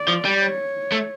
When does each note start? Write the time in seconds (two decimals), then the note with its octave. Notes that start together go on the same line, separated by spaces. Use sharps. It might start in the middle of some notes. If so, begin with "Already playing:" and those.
Already playing: D5
0.08 F3
0.25 G3
0.41 C#5
0.92 A3